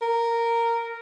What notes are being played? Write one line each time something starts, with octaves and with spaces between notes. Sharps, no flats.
A#4